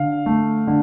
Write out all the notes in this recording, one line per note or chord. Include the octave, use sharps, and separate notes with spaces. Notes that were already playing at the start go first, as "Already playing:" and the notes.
Already playing: D3 F5
A3
D3